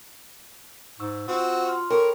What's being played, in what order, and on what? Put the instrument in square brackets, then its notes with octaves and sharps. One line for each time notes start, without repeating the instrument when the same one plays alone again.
[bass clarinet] G#2 [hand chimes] C#6 E6
[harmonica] C4 F#4 [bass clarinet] F4
[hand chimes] C6 F6
[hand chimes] A4 G5 B5 [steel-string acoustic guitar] A#4 [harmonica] C#5